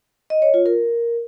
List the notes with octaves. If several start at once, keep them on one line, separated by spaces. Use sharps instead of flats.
D#5
C#5
F4
A#4